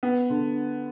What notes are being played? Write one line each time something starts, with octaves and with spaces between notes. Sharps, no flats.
B3
D3